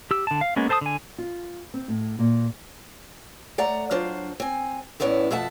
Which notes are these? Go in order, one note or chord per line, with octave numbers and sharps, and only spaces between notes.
G4 E6
D3 A5
F5
G#3 A#3 B3 C#4
A4 C5 A5 A#5 D#6
D3 G#5
F4
C4
A2
A#2
A3 D5 F#5 A#5
F#3 D4 F4 C5
C4 G#5
E2 A2 B3 C#4 D4 E4
F2 B2 A3 E5 F#5 A5